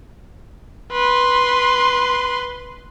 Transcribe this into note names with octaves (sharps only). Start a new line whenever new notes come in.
B4 C6